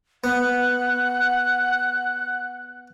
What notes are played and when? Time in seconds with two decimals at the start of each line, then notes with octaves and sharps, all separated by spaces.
0.24 B3 F#5 F#6